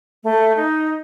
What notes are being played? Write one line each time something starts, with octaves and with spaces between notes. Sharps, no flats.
A3
D#4